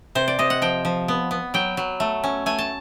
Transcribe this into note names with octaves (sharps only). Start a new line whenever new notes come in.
C3 C5
D5
C3 D#5
F#5
F3 G5
F3
B3
B3
F#3 G5
F#3
A3
C#4
A3 G#5
A5